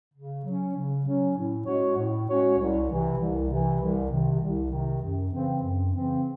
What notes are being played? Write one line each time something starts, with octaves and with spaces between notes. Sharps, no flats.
C#3
F#3 C#4
C#3
F#3 C#4
A2
G#3 C#4 F#4 C#5
A2
G#3 C#4 F#4 C#5
C2
C3 E3
C2
C3 E3
C2
C3 D#3
C2
C3 D#3
F#2
C#3 E3 C4
F#2
C#3 E3 C4